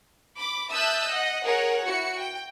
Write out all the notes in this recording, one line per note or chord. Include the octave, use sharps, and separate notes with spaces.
B5 D6
E5 A5 D#6 E6 F#6 G6
D#5 F#5
G#4 A#4 C#5 F#5
E4 F#4 C#7
G5